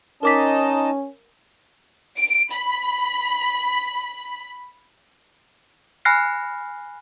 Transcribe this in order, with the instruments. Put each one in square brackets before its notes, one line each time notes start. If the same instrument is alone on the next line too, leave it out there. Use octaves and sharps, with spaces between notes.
[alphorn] C#4 [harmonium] D#4 D#5 A5 [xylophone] A#4 D6 B6
[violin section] D7
B5
[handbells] G#5 B5 F6 F#6 A#6 C7